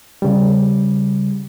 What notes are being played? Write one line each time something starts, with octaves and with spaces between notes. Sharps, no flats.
C#3 G3